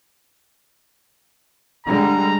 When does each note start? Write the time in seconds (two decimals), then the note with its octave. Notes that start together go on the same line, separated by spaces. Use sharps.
1.86 D3 G3 G#3 A#5